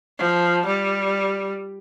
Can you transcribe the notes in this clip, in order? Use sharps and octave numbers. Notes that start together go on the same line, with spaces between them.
F3
G3